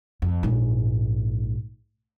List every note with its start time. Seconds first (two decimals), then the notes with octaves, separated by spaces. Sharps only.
0.22 F2
0.43 A#1 G#2